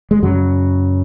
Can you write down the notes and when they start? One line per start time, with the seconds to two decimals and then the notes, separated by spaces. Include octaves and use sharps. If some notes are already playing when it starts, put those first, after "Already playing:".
0.11 G#3
0.22 F#2 C#3 F#3